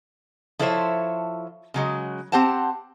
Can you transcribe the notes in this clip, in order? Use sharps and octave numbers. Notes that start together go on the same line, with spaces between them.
F3 E4 A4 C5 C#5 E5
C#3 F#3 G#3
C4 G4 C5 F#5 A5